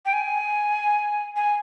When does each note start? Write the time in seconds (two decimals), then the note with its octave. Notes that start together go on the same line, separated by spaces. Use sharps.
0.06 G5
0.13 G#5
1.36 G#5